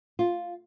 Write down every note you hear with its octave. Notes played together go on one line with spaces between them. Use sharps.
F4